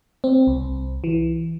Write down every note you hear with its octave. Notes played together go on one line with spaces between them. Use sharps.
C4
C2
E3